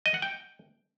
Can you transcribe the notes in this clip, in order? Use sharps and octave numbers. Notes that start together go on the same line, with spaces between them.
D#5
F#5
G5